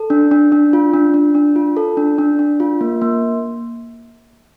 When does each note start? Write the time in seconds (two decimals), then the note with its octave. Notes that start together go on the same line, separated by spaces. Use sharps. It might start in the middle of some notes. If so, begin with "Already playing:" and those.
Already playing: A4
0.10 D4
0.31 D4
0.52 D4
0.73 F4
0.94 D4
1.14 D4
1.35 D4
1.56 F4
1.77 A4
1.97 D4
2.18 D4
2.39 D4
2.60 F4
2.81 A#3
3.01 A#3